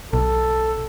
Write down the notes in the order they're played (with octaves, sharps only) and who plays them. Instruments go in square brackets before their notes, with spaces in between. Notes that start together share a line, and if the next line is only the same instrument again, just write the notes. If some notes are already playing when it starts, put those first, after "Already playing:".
[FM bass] B1 [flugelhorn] A4